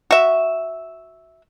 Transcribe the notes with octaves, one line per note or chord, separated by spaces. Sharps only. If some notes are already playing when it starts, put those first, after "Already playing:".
F#4 E5